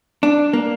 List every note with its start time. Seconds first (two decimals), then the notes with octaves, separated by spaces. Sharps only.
0.23 D4
0.53 A#3